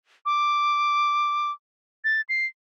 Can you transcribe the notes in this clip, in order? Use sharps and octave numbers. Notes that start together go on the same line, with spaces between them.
D6
A6
C7